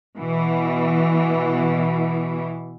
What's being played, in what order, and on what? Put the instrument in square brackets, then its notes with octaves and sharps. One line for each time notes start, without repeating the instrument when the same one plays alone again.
[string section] B2 E3